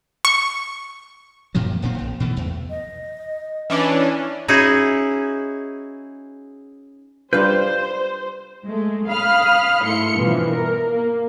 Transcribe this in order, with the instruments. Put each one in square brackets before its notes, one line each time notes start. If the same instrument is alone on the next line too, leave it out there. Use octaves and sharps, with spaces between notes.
[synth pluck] C#6
[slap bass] F#2 A#2 F3 F#3
D#1 A#2 D#3 C4
A#1
B2 E3 A3
E2
[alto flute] D#5
[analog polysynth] E3 C#4 D4
[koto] C#4 D#4 E4 F#4 G#4
[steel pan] G3 D4 F4 [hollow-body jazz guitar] B4 F5 [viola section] C5 [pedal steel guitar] G6
[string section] G#3 A3
F5 B5 D#6 F6
G#2 A3 E4 C6 C#7
G2 B2 E3 F3
A#4
A#3